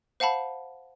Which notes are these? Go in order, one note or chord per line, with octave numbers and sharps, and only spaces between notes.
C5 F5 F#5 A5 B5